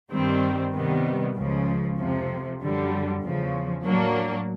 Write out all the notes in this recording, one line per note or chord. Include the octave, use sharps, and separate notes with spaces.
G2 D#3 G3 C4
C3 D#3 G3 B3
C#2 C#3 F3
F2 C3 F3
F#2 D3 G3
E2 C#3 F3
A2 F#3 A#3 D4